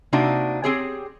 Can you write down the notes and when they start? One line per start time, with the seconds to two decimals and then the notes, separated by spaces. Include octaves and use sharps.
0.13 C3 A#3 C4 D4 D#4 F#4
0.64 C4 G4 G#4 C#5